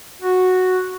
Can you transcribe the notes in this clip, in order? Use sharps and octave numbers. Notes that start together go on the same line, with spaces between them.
F#4